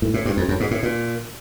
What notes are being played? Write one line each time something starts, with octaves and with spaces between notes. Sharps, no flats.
A2
A2
G2
F2
F#2
G#2
A2
A#2